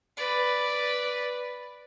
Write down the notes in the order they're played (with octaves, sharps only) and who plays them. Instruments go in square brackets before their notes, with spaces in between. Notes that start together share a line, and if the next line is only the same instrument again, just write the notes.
[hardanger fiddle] B4 D5